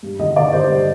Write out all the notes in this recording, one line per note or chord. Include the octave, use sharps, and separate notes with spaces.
G2
D3 D#5
D3 D5
D3 C5
G2